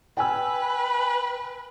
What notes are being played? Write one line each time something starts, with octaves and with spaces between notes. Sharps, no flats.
B4 G5 G#5 E6